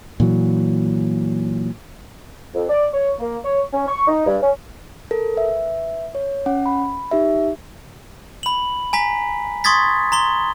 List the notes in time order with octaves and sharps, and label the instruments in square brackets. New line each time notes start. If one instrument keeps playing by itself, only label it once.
[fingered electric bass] A#2 E3 F#3
[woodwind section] F2
D5
C#5
A#3
C#5
C#4
C#6
D#4
G2
C#4
[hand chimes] A4 A#4
B4 E5
C#5
C#4 F#5
B5
D#4 G4 E5
[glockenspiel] B5 F#7
G#5 A#5 B6
C6 C#6 D#6 G#6 A6 B6
A#5 C6 G7